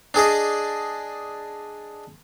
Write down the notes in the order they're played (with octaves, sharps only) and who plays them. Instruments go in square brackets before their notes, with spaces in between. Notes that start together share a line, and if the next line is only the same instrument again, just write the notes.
[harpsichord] D4 G#4 D5 D#5